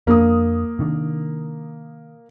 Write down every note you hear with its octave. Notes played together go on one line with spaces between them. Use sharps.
F2 A#3 D4 D#6
C3 D#3 D4